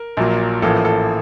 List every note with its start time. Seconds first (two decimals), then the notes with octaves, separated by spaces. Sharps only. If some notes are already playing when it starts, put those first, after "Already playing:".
Already playing: A#4
0.17 A#1 A#2 F#3 A#3
0.62 A1 A2 F3 A#3 A4
0.85 A4